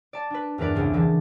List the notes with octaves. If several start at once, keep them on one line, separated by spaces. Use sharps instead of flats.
D5 A5
D4 B4
E2 G2 D3 A#4 B4 D5
C2 C#3 D4
D3 E3 A4